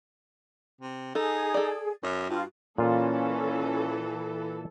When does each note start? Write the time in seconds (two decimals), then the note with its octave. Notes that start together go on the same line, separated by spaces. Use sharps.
0.81 C3
1.15 D#4 G#4 A4
1.54 A4 D5
2.03 F#2 F#4
2.30 G2 F4
2.78 A#2 E3 C#4 F4 A4